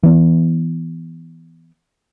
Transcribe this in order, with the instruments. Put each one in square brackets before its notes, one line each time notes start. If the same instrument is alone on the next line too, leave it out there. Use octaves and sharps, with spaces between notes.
[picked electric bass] E3 B3